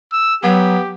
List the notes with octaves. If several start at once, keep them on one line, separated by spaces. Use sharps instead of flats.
E6
F#3 B3 G4